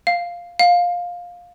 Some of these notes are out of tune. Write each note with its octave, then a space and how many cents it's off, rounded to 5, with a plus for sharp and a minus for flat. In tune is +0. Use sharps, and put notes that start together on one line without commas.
F5 +0
F5 +15